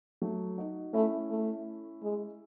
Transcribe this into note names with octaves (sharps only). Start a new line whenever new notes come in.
F#3 A3
D#4 F#4
A3 C#4 E4
A3
G#3